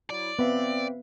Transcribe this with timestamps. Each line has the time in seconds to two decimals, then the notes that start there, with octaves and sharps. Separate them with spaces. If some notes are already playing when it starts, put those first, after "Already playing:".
0.10 F#3 E4 D5
0.39 B3 C4 B4 E5 F5